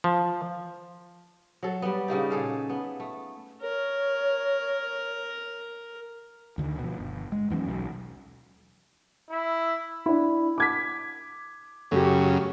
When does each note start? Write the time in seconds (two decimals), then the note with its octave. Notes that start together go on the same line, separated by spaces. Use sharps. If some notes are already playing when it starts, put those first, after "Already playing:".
0.04 F3
1.63 F#3 A4
1.82 G3 B3
2.08 C#3 G3 A#3 D#4
2.30 A#2 G#4 A4 F5
2.70 B3
3.00 A3
3.62 A#4 C#5
6.58 D2 D3 D#3
6.79 B2 F3
6.99 G1
7.32 G#3
7.50 D#2 E3 F#3 C#4
7.68 B1
9.31 E4
10.06 D4 E4
10.58 D6 G#6 B6
11.91 F#2 C#3 A3 G4